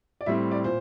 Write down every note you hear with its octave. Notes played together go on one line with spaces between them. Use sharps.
D5
A2 G3 C4 E5
D5
A#2 C5